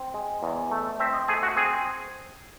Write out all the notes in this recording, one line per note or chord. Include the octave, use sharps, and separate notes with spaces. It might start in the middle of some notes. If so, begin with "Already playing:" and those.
Already playing: C4
G#3
E2
A3
C4 E5
D#5
A3 G#4
F#4
C4 G#4